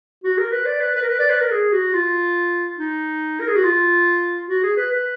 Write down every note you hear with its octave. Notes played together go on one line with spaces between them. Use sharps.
F#4
A#4
B4
D5
B4
B4
A#4
B4
D5
B4
A#4
G#4
F#4
F4
D#4
A#4
G#4
F#4
F4
F#4
G#4
B4
B4